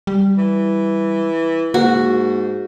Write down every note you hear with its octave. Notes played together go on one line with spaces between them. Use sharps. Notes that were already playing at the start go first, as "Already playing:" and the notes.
G3
E3
G#2 A#3 F#4